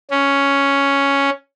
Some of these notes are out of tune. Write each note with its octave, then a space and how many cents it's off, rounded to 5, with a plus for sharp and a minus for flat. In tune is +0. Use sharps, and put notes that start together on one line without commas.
C#4 +5